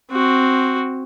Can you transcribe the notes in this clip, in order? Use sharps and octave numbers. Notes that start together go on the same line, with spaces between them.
C4 F#4